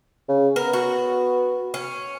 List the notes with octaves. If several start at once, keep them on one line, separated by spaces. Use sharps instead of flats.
C#3
B3 A#4
F#4
C#4